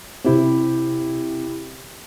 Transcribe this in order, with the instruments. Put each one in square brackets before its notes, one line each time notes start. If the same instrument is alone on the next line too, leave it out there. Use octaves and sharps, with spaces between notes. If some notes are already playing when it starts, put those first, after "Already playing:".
[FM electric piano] C3 C4 [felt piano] E4 G4